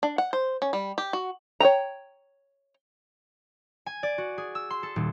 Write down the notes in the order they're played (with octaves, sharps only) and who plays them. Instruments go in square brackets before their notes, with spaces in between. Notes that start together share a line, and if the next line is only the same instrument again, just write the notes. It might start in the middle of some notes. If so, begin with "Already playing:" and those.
[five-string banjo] D4
F#5
C5
C#4
G3
G4
F#4
C#5 D#5 G5 A#5
[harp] G#5
D5
F#4
G#4
E6
C6
A4
D#1